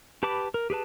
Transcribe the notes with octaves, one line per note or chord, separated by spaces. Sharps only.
G4 B4 A5 B5 D6
A#4
G4 G#4 B4 A5